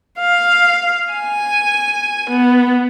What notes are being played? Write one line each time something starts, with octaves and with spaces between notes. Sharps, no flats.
F5
G#5
B3